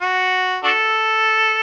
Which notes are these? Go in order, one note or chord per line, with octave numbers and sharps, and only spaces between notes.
F#4
D4 F#4 A4